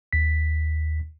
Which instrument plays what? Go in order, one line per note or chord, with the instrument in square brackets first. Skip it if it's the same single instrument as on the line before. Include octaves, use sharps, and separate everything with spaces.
[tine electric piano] D#2 B6